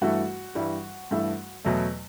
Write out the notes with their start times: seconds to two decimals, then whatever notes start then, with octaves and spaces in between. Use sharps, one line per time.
0.01 G2 E3 A3 F#4
0.55 G2 E3 G3
1.11 G2 E3 A3
1.64 E2 B2 F#3 A3